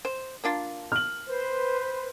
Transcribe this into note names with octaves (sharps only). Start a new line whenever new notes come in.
C5
A#3 D4 F4
F6 F#7
B4 C5